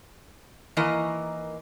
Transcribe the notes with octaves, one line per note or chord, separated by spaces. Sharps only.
D#3 E3 A#3 A#4 D#5